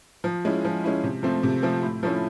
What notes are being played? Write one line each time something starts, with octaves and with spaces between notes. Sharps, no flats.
F3
G#3 C#4 E4
F3
G#3 C#4 E4
C3
F3 A3 C4
C3
F3 A3 C4
A2
F3 A3 C#4 E4